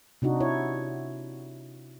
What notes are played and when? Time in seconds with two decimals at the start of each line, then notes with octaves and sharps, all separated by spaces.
0.22 C3 D4 D#4 F#4
0.40 E4 C#5